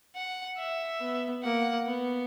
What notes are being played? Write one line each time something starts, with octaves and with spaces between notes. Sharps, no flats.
F#5
E5
B3
A#3 F#5
B3